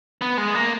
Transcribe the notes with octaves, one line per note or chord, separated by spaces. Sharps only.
B3
G#3
A#3